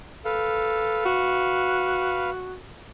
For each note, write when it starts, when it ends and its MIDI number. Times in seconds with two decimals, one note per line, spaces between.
0.25 1.04 69
0.25 2.30 71
0.25 2.30 77
1.05 2.57 66